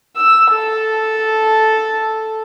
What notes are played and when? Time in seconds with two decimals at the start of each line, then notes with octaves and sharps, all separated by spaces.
0.17 E6
0.52 A4